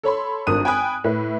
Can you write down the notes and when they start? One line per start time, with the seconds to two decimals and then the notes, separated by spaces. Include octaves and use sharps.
0.03 A4 C#5 B5 C6
0.47 G#1 G2 A#4 D#6 F#6 D#7
0.65 G5 G#5 B5 D#6 F#6
1.04 A2 E4 B4